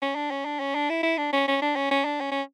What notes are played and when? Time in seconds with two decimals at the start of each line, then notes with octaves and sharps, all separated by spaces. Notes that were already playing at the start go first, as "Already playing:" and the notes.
0.02 C#4
0.15 D4
0.31 C#4
0.45 D4
0.60 C#4
0.75 D4
0.89 E4
1.03 E4
1.18 D4
1.33 C#4
1.48 C#4
1.62 D4
1.76 C#4
1.91 C#4
2.05 D4
2.21 C#4
2.31 C#4